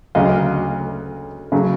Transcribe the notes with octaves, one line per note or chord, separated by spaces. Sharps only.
D2 C#3 F#3 D#5 F5
C#3 F#3